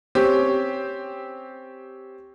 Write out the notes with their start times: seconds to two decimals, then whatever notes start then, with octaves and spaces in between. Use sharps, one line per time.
0.15 C4 C#4 G4